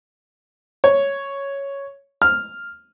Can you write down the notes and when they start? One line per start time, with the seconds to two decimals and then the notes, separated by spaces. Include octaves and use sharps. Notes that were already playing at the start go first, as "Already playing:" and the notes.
0.84 C#5
2.22 F6